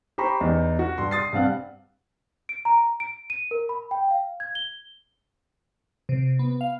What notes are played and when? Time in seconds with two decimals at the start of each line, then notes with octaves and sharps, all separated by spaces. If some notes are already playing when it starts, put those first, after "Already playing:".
0.18 G4 C5 A#5 B5 C#6
0.41 E2 D#4
0.79 F#4
0.98 G2 C6
1.11 D#6 A6 C7
1.33 G2 C4 F5 F#5
2.49 D7
2.65 A#5
3.00 D7
3.30 D#7
3.51 A#4
3.69 B5
3.91 G5
4.10 F5
4.40 G#6
4.55 G7
6.09 C3
6.39 B3
6.61 F5